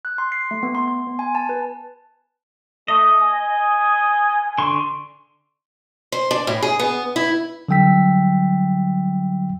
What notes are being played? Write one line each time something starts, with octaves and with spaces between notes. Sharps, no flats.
F#6
C6
C7
A3
B3
C6
C6
B3
G#5
A5
B4
A3 D#5
G#5
D3 C6 C#6
C5
D4
A2
G#4
B3
E4
D3 F#3 G3 G5 E6 B6